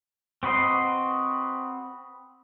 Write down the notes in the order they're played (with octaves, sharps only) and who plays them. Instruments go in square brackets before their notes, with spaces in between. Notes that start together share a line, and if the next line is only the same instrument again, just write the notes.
[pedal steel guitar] C4 F#4 B4 D#5 C6